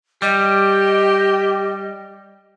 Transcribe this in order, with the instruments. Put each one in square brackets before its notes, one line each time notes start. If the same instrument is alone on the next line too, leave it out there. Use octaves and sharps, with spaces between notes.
[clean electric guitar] G3 [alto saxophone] G4 [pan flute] D#5